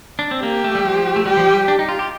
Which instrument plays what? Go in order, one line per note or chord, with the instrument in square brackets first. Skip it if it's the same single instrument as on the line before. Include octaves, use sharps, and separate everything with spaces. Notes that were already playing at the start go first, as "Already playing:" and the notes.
[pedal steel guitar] D4
C4
[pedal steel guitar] A#3 [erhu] G4
[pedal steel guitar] A3
G3
F3
A3
[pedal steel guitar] G3 [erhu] G4
[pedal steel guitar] F3
G3
D4
D#4
F4
G4